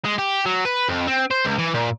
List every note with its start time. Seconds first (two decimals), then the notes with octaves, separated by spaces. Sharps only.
0.05 G#3
0.19 G4
0.46 F#3
0.65 B4
0.89 F2
1.07 C4
1.31 C5
1.45 C#2
1.58 E3
1.74 A#2